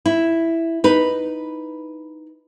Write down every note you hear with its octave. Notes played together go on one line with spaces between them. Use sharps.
E4
D#4 B4